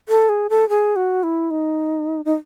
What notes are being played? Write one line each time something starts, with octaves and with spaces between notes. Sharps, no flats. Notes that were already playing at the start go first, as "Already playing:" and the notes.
A4
G#4
A4
G#4
F#4
E4
D#4
D#4